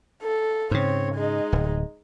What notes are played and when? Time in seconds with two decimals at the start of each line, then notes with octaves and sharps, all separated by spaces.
0.23 A4
0.71 G#2 C#3 C4 C#5
1.15 G#3 D#4
1.52 D1